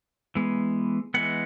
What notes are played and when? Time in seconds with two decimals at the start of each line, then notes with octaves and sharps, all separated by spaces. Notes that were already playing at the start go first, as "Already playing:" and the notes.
0.35 E3 G#3 B3
1.14 E3 G#3 B3 F#5